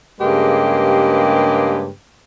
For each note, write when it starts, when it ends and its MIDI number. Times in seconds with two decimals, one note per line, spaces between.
0.20 1.89 43
0.20 1.89 49
0.20 1.89 56
0.20 1.89 58
0.20 1.89 67
0.20 1.89 71